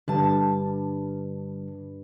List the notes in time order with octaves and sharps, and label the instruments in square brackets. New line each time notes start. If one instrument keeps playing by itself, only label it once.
[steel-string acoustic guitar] G2 A5 [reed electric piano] D3 G3